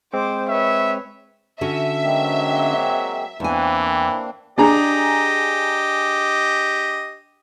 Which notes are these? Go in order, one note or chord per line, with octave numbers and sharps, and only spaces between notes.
G#3 C4 C5 D6
B4 C#5 E5
D3 C#4 F#4 E5
F#3 G#3 A#3 C4
E2 E3 A#3 C4 D4 G#5
D4 G4 G#4 D#5 A#5